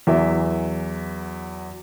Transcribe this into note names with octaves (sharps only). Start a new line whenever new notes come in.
E2 E3 F#3 E5